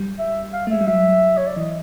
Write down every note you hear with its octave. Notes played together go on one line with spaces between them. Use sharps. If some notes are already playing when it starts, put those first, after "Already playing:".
Already playing: G3
E5
F5
A3
G#3 E5
G3
F#3 E5
C#5
D5
E3 D#5